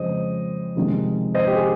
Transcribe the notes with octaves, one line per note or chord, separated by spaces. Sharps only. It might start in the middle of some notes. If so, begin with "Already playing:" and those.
Already playing: F2 C#3 G#3 C4 C5 D#5
F2 C3 D#3 G#3
C5 D#5
G4
G#4